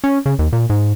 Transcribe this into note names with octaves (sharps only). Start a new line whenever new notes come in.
C#4
C#3
D#2
A#2
G#2